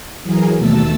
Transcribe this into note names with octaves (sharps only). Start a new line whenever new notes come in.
E3 F#3 G#4 A#4
D#2 B2 A3 A5 E6